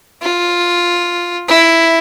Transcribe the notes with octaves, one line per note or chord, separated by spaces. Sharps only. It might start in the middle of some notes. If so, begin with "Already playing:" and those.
F4
E4